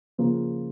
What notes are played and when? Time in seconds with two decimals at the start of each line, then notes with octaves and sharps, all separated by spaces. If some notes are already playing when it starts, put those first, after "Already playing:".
0.18 C#3 F3 A#3 F4